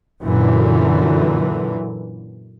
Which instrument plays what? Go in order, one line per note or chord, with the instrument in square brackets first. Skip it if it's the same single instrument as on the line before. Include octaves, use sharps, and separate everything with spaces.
[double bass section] F#2 A#2 D3 E3